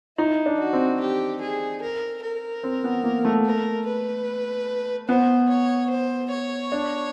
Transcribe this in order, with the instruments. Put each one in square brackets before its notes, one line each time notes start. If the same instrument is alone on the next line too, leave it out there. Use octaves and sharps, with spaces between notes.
[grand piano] D#4 [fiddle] E4
[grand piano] D4
[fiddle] F#4
[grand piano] C4
[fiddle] G4
G#4
A#4
A#4
[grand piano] C4
B3
A#3
A3
[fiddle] A#4
B4
[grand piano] B3 [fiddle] C5
[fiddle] C#5
C5
C#5
[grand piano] D4